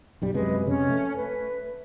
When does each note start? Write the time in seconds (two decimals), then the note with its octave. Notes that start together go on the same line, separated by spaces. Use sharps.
0.22 B1 G2 G3
0.34 F#2 C3 G#3 B4 D#5
0.67 F2 C3 C#4 C#5
0.90 A3
1.15 B4